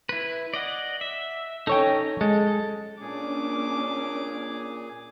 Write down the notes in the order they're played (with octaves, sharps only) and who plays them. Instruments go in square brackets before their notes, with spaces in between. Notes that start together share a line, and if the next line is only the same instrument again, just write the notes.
[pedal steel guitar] E4 B4
D5 D#5 F#5
E5
[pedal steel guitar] C#4 D#4 [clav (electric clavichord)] A4 C#5 G5
[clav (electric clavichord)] G#3 [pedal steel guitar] A4
[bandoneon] A#2 G#4 [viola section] A#3 C#4 D4 [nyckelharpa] D6